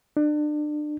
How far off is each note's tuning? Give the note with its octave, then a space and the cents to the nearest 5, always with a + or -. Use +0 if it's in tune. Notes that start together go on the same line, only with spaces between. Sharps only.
D4 +30